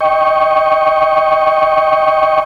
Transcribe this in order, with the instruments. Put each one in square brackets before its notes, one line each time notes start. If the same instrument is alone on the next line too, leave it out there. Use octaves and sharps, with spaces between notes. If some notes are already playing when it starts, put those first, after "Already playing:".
[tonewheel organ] D#5 G5 C#6